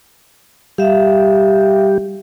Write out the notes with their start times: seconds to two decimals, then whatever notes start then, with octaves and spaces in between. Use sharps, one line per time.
0.78 G3 G4 E5 F5